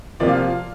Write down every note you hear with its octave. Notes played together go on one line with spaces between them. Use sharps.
C3 F3 A#3 F4 D5
F5